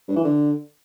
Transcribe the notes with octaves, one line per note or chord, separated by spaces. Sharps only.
G2
E3
D3